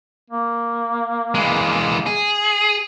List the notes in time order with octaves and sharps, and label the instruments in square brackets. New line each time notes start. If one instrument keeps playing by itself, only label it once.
[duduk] A#3
[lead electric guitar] E3 G#3
G#4